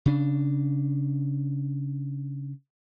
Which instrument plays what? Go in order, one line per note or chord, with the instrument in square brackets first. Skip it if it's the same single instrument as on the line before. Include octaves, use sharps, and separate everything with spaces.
[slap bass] C#3 D4